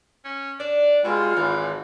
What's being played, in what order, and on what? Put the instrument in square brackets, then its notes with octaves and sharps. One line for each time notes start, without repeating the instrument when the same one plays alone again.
[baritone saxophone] C#4
[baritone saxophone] D4 [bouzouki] D5
[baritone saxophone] B2 [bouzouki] G3 G#4 [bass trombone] G#3 [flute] F4
[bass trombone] G#1 [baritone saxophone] E3 [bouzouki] D#4